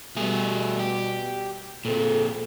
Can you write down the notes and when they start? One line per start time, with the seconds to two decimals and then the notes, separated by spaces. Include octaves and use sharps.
0.17 B2 G3 A3 G#4
0.79 G4
1.85 A#2 C4 F4 G#4 A4